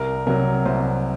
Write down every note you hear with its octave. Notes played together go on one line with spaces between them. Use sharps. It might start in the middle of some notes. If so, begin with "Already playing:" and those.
Already playing: C2 A#4
C3 F#3 A#4
C2 C5